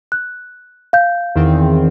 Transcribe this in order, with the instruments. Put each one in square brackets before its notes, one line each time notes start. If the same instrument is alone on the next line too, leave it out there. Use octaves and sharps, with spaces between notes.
[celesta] F#6
F5 G6
[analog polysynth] E2 D#3 C4